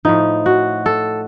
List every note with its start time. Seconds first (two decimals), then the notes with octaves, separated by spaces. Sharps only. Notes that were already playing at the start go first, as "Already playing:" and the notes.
0.05 A2 F3 D#4
0.46 F#4
0.86 A4